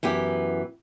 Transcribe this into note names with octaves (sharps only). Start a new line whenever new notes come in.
F#2 E3 B3 G4